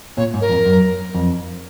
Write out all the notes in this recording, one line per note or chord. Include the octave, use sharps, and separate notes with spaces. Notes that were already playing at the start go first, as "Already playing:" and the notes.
A#2 C#5
G#2
A#4
F2
F#2
F2